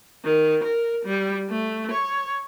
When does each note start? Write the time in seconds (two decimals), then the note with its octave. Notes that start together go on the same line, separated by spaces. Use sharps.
0.24 D#3
0.64 A#4
1.05 G3
1.50 A3
1.91 C#5